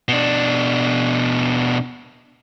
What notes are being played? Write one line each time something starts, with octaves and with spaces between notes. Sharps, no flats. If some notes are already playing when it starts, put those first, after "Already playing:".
B2 D4